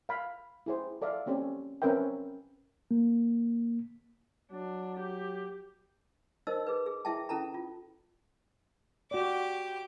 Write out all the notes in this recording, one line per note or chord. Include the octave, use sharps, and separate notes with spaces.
F5 B5
E4 G#4 C5
A4 D5 E5 F5
A#3 C4 C#4 G4 A4
C4 C#4 A#4 B4 E5 G5
A#3
F#3 D4
G4
D#4 A#4 C5 D#5 E6
G#4 B4
G#4
E4 G#4 E5 G5 A5
C#4 E4 A4 A5 A#5
F4
F#4 G4 D5 D6